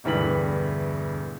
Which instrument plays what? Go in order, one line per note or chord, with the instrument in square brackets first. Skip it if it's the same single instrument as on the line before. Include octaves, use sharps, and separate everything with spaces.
[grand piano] E1 D2 G2 E3 B6 F#7